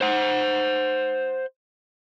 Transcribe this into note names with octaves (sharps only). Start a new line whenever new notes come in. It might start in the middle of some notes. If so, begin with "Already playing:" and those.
C5 F#5